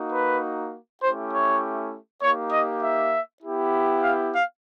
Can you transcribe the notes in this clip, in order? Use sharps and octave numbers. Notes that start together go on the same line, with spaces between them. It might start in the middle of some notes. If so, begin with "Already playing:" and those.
Already playing: A#3 D#4 F#4
B4
A3 C#4 E4 G4 C5
C#5
A#3 D#4 G4 C#5
D#5
E5
B3 E4 G4
F5
F5